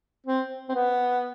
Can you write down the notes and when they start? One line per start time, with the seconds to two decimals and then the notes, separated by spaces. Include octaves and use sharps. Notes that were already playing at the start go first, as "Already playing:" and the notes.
0.26 C4
0.68 C4
0.74 B3